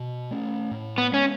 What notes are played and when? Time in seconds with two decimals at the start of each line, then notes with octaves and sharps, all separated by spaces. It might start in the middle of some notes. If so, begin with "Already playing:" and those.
Already playing: B2
0.31 A3 C#4
0.71 A2
0.98 B3
1.12 G#3 B3 C#4